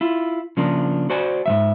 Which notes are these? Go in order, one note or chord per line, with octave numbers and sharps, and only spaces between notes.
E4 F4
C#3 F3 A#3 D4
F#4 C5 D5 G#5
G#2 E3 E5